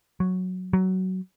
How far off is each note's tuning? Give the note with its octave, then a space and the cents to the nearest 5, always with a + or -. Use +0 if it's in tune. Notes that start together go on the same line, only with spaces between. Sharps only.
F#3 -5
F#3 +15